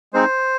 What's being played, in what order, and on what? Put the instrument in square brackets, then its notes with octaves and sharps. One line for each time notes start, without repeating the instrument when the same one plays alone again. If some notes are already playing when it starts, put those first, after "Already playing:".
[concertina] G#3 C4 D#4 C5